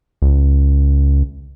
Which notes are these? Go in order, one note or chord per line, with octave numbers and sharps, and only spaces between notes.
C#2